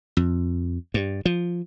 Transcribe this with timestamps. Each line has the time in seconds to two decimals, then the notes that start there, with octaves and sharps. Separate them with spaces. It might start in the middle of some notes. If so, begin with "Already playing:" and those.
0.17 F2
0.94 G2
1.25 F3